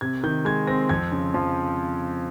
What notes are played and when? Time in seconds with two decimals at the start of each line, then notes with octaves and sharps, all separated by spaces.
0.01 C3 G#6
0.23 D#3 G6
0.45 G#3 G#6
0.67 C4 A#6
0.89 F2 G#6
1.12 C#3
1.34 F3